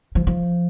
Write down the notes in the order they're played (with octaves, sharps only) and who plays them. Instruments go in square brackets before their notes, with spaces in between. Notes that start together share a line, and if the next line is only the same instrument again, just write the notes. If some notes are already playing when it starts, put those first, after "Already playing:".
[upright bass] F3
F3